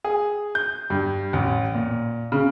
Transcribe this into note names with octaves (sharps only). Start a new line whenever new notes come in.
G#4
G6
G2
A1
A#2
C#3